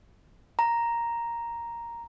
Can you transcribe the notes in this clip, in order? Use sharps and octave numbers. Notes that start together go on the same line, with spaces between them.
A#5